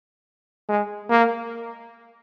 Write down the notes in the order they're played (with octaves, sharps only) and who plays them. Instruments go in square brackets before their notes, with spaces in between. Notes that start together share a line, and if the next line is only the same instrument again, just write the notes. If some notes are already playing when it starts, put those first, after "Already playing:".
[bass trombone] G#3
A#3